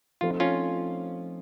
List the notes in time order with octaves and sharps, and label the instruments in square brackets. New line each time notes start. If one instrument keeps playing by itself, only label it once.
[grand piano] F3 A3 C4 D#4 [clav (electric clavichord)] F4
[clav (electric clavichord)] C#4 F4